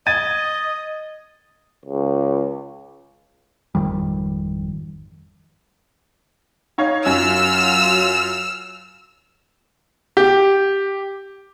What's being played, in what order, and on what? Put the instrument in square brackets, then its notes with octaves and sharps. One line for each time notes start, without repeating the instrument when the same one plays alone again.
[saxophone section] D#5 [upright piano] G#6 A6 D#7
[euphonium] C#2
[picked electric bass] G#1 F2 D#3 G3
[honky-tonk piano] D#4 C#5 F5
[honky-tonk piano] F#2 [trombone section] F#3 F4 [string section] E6 F6
[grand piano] G4